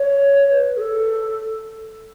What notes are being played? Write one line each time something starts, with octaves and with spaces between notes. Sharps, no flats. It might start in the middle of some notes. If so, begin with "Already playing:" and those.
Already playing: C#5
B4
G#4
A4